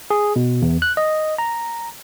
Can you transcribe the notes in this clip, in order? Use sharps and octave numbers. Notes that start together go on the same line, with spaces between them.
G#4
B2
E2
F#6
D#5
A#5